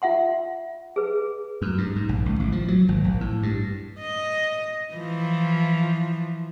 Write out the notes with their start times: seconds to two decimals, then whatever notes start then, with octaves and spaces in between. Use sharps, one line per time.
0.02 F4 E5 F#5 C6
0.96 G#4 B4
1.62 F#2
1.78 G2
1.96 G#2
2.09 A#1
2.26 C#2
2.40 A1
2.52 F3
2.68 F#3
2.88 G#1
3.04 A#1
3.21 A2
3.43 G2
4.00 D#5
4.94 E3 F3